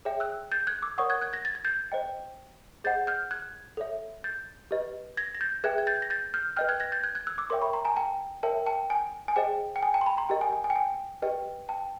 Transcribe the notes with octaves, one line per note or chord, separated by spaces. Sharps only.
G#4 C#5 E5 G5
E6 F#6
G6 A6
F#6 G#6
D6 E6
A#4 C#5 F#5 C#6 D#6
F#6 G#6
F#6 G#6
G#6 A#6
A6
G#6
G6 A6
C5 D#5 G5
G#4 C5 D#5 F#5 G6 A6
F6 G6
F#6 G#6
A4 C#5 E5
G6 A6
G4 B4 D#5
G#6 A#6
A#6
G6 A6
G#4 B4 E5 G5 F#6 G#6
G#6
G6 A6
A#6
G6 A6
F6 G6
B4 D#5 G5 F6 G6
F#6 G#6
G#6 A#6
G6 A6
F#6 G#6
F#6 G#6
E6 F#6
D6 E6
A#4 C#5 E5 G5 C6 D6
B5 C#6
A#5 C6
G#5 A#5
G5 A5
A#4 C#5 E5 G5 A5
G5 A5
G#5
G#5
G#4 C5 D#5 G5
G5
G#5
G5 A5
C6
A5 B5
A#5 C6
G4 A#4 D#5 G5
G#5
G#5
G#5
G5
G#5
G4 B4 D#5 G5
G5 A5